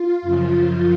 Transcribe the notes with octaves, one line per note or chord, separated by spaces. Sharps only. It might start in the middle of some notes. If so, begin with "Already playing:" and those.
Already playing: F4
F#2 C#3 F3